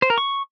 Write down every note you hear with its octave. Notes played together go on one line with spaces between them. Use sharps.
C5
A#4
C#6